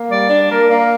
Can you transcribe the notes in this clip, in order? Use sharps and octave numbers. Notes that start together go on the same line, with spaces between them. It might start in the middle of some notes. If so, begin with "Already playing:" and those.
Already playing: A#3
G3 D5
D4
A#3 A#4
A#3